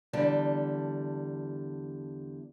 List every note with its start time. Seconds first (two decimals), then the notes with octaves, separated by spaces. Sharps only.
0.13 E2 D3 G3 A5